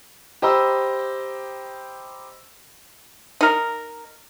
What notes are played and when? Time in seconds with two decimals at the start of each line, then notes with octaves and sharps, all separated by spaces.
0.42 G4 C5 D#5 A#5 B5 E6
3.41 D#4 A#4